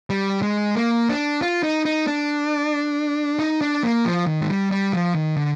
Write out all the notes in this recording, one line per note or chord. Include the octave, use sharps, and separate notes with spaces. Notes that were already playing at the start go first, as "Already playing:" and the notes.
G3
G#3
A#3
D4
F4
D#4
D#4
D4
D#4
D4
A#3
F3
D#3
G#3
G3
G3
F3
D#3
D3